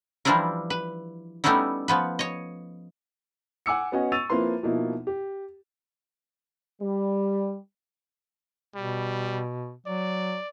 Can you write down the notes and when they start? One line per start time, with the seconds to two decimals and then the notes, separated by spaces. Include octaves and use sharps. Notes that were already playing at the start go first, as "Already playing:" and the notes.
0.25 E3 F3 G3 D4 E4 A#4
0.70 B4
1.44 G3 A3 B3 C#4 D#4 E4
1.88 F3 B3 B4
2.19 C#5 D#5
3.66 F#5 G#5 D6 E6 C#7
3.92 B3 C#4 F#4 D#5 G#5
4.12 C#6 E6 A6 D#7 F7
4.30 F3 A#3 C4 E4 B4 C6
4.63 B2 F3 A#3 D#4 E4
5.07 G4
6.81 G3
8.75 B2 G3
9.86 F#3 D5